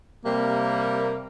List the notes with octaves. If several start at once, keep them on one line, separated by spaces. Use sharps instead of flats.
C3 G3 A#3